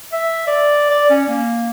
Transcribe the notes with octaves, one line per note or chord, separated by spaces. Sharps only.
E5
D5
D5
C#4
A#3